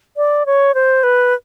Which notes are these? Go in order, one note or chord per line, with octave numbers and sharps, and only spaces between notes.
D5
C#5
C5
B4